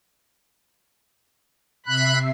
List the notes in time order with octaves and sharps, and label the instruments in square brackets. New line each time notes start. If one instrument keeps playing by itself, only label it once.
[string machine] C3 E5 C7 [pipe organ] B5 F#6